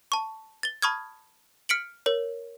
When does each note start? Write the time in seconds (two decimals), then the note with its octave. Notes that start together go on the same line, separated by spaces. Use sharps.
0.12 A5 C#6
0.63 A6 G7
0.82 A5 B5 C#6 D#6 F6 G#6
1.69 F6 B6 C#7 D7 F#7
2.06 A#4 C#5